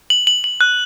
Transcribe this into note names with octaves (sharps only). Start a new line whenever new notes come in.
F#7
F#7
F#7
F#6